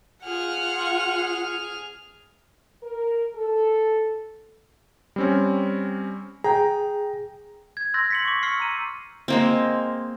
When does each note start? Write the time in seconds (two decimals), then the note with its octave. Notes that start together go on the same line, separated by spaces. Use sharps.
0.25 F4 G#4 F#5 F6
2.83 A#4
3.34 A4
5.16 G3 C4 C#4
6.44 G#4 G5 A#5
7.77 G#6
7.94 C6 E6 F#6 G6 A6 A#6
8.10 B6 C#7 F#7
8.25 C#6 D6
8.43 C#6 E6 F6 C7 C#7
8.60 A#5 D#7
9.28 G#3 A#3 C4